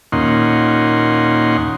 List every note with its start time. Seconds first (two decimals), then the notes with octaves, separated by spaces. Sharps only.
0.12 D#2 A#2 C#4 D#4 F#5 C6